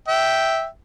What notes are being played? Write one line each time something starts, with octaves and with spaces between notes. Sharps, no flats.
E5 G5